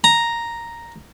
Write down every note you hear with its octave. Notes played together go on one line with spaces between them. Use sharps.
A#5